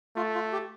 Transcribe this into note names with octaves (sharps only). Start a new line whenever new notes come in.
A3 F4
F4
G4